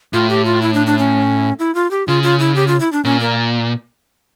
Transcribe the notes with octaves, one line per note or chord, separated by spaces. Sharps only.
A2 F4
G4
F4
E4
D4
D4
C#4
E4
F4
G4
C#3 F4
F4
E4
G4
F4
E4
D4
A#2 C#4
A#3